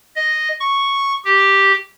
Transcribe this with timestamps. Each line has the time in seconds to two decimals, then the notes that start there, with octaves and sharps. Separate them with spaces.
0.16 D#5
0.60 C#6
1.25 G4